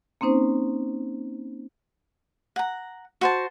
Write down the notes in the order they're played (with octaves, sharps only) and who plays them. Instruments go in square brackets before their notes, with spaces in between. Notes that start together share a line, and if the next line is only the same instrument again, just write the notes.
[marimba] A#3 C4 C#4 D#4 C5
[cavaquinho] F#5 A#5
F#4 C5 A5